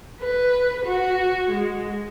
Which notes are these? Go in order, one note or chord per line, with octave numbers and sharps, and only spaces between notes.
B4
F#4
G#3